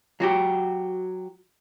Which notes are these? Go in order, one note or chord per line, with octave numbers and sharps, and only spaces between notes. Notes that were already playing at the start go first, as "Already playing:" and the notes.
F#3 F#4 G4